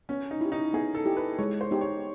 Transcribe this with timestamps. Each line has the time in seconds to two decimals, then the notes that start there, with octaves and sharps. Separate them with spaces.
0.09 B3 C#4
0.31 D#4
0.41 E4 G4
0.52 D#4
0.74 B3 G#4
0.95 A4
1.05 E4 G4
1.17 B4
1.38 G#3 C#5
1.61 C5
1.71 B3 D#4 G4
1.81 C#5